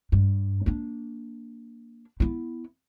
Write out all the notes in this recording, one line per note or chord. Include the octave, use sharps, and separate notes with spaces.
G2
A#3 D4
B3 E4